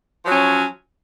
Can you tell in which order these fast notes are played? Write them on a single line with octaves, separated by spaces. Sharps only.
F3 F#3 C#4